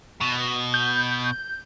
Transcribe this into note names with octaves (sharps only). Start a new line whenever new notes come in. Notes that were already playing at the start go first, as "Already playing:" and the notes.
B2
G6